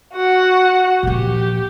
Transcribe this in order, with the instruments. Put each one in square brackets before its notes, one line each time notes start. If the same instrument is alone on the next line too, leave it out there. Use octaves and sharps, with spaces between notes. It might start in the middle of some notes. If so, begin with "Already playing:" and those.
[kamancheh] F#4 F#5
[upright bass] A#2 F3 [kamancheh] G4